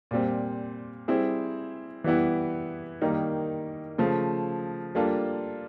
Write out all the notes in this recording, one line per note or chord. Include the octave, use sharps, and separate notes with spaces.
A#2 G3 C4
G3 C4 E4 G#4
E3 G3 B3 E4
D#3 G3 A#3 D#4
C#3 F3 A3
G3 A#3 D4 F4 A4